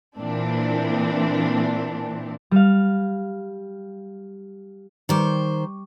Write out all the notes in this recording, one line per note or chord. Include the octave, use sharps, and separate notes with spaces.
A#2 E3 C4 D4
G3 F5
D#3 G3 C5 C#6 D6